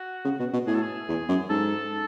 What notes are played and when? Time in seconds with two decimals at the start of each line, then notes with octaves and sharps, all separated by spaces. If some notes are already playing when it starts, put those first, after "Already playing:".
Already playing: F#4
0.25 C#3
0.40 B2
0.53 B2
0.67 A2 G#4
0.74 A4
0.82 G#4
1.09 E2
1.29 F#2
1.50 G#2 A4